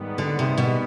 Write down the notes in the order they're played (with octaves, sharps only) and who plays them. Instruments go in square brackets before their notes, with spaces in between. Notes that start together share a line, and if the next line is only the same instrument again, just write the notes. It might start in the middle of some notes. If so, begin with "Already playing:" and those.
Already playing: [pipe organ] G#2 D#3 G3 B3
[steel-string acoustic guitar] D3
C3
B2